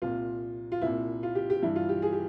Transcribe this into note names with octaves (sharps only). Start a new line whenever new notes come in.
C2 A#2 F4
F4
C2 A#2 E4
F4
G4
G4
G2 E3 E4
F4
G4
G#4
G4